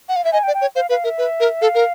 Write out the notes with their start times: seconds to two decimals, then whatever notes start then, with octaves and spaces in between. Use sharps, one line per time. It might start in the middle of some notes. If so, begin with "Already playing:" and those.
0.09 F#5
0.16 F5
0.25 E5
0.32 D#5 G#5
0.43 G5
0.47 D5
0.54 G5
0.61 C#5
0.75 C5 F5
0.89 B4 F5
1.04 A#4 E5
1.18 B4
1.40 A#4
1.62 A4 F5
1.75 A#4